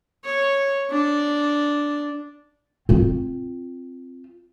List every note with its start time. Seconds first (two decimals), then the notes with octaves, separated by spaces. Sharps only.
0.24 C#5
0.91 D4
2.89 C4 F4